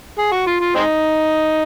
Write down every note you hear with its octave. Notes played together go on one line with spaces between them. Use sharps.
G#4
F#4
F4
F4
G#3 C4 D#4